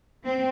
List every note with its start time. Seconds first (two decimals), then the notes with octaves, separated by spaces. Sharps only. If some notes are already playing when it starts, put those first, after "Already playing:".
0.24 C4